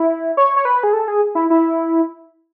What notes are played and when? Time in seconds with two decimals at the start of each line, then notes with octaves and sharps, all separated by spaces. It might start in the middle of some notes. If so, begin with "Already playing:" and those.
Already playing: E4
0.37 C#5
0.56 C#5
0.65 B4
0.83 G#4
0.93 A4
1.08 G#4
1.35 E4
1.50 E4